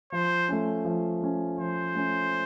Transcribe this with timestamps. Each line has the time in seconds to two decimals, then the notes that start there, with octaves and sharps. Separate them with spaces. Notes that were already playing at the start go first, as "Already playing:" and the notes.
0.12 F3 C5
0.48 A3 C#4
0.85 F3
1.22 A3 C#4
1.58 F3 C5
1.95 A3 C#4